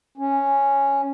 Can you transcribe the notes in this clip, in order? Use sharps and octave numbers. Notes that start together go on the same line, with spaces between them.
C#4